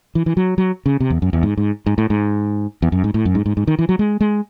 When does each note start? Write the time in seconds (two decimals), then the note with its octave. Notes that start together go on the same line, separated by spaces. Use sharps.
0.15 E3
0.26 E3
0.37 F#3
0.58 F#3
0.86 C#3
1.00 C3
1.10 E2
1.22 F#2
1.33 E2
1.43 G#2
1.57 G#2
1.86 G#2
1.98 A2
2.10 G#2
2.82 E2
2.92 F#2
3.04 G#2
3.14 A2
3.25 F#2
3.35 G#2
3.46 G#2
3.57 G#2
3.67 D#3
3.79 E3
3.89 F#3
3.99 G#3
4.21 G#3